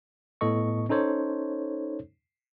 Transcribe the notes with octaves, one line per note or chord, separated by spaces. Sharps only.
A2 B3 A4 D#5 C#6
C#4 D#4 A4 C5 C#5